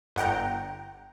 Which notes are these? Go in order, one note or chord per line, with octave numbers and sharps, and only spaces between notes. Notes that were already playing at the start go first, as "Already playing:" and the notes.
G1 F#5 G5 A#5